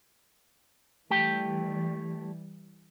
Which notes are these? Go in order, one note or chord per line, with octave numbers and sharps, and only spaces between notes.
E3 G3 A3 G4 G5